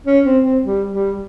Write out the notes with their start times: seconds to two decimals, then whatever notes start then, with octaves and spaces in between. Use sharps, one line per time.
0.07 C#4
0.26 C4
0.45 C4
0.63 G3
0.92 G3